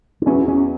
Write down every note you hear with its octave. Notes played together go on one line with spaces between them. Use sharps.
D4
E2 B2 F#3 B3 C#4 E4
C#4